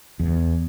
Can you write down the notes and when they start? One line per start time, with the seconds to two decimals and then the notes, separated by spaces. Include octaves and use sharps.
0.20 E2